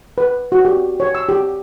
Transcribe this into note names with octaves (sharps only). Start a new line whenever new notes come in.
B4
F#4
G4
C#5
E6
G4